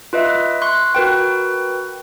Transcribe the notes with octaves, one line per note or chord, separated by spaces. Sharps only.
F4 B4 D#5 E5
C6 C#6 F#6
F#4 A#4 B4 G5